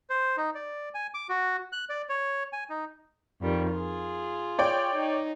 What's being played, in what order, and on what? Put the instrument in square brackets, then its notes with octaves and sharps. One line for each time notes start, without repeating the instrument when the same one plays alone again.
[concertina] C5
D#4
D5
G#5
D6
F#4
F#6
D5
C#5
G#5
D#4
[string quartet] F2 D#3 G3
F4 G#4
[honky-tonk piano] C#5 D5 G5
[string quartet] D#4